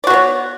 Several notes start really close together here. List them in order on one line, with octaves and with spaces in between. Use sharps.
D5 F#4 B3 C#5